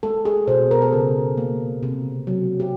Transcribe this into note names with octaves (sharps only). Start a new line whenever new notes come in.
G#3 A4
G#4
B2 C5
A#4
A4
C#3 G#4
A#3
C3
F#3
G4